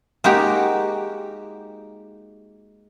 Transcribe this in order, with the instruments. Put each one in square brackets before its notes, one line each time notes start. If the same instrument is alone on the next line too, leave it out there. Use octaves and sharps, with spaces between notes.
[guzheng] G#3 A#3 D#4 F#4 G4